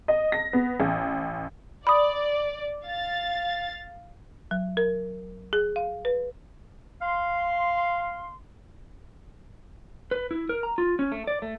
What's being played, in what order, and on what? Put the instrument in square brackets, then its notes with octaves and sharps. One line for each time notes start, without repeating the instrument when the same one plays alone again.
[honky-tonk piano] D#5
A#6
B3
A1
[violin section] D5 [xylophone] B5 D#6
[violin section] F5 A6
[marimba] F#3
A#4
G#4
F5
B4
[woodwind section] F5 C6
[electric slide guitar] B4
E4
A#4
A#5
F4
C#4
A3
D5
A3